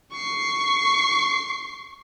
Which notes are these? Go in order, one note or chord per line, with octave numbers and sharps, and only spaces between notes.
C#6 C7